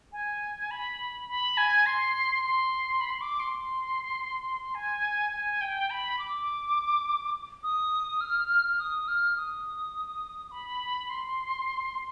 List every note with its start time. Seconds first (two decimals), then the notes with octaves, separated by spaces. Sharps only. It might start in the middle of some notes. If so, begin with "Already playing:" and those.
0.12 G#5
0.71 B5
1.29 B5
1.57 G#5
1.86 C6
2.44 C6
3.01 B5
3.11 C6
3.21 D6
3.40 C6
4.75 G#5
5.32 G#5
5.61 G5
5.90 B5
6.19 D6
7.63 D#6
8.21 F6
8.79 D#6
9.08 F6
9.37 D#6
10.51 B5
11.10 C6